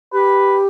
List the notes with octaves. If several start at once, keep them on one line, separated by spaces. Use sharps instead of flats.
G4 B4